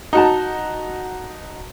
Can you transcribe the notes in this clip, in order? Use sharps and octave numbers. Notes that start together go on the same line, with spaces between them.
D#4 F#4 A5